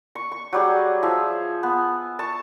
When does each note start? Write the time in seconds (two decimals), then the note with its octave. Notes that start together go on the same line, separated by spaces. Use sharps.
0.15 C#6
0.32 C#6
0.53 F#3 G3 G#4
1.03 F3 G#4 E5
1.63 B3
2.19 A5 C#6